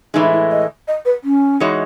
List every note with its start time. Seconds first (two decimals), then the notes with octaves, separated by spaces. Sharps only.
0.14 A2 E3 G#3 D#4
0.32 E4
0.51 D#5
0.88 D#5
1.05 B4
1.24 C#4
1.60 E3 G#3 D#4 F#4 C#5